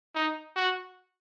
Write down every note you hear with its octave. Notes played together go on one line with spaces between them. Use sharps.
D#4
F#4